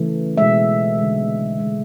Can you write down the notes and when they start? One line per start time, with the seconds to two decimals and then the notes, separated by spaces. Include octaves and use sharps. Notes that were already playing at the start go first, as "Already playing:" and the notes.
Already playing: C#3 E3 A3
0.37 B2 G#3 E5
0.98 D3 G#3
1.59 B2 G#3